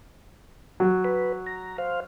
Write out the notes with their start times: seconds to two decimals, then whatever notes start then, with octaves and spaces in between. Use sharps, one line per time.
0.80 F#3
1.05 B4
1.46 A#5
1.78 C5 F5